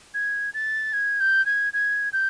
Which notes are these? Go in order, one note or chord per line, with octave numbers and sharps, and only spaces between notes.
G#6
A6
G#6
G6
G#6
G#6
G6